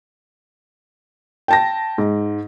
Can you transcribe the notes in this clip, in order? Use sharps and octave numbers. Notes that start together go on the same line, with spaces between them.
G5 A5 A#6
G#2